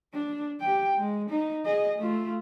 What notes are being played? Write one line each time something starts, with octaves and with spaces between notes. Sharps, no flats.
D4
G4 G5
G#3
D#4
G#4 D#5
A3 F4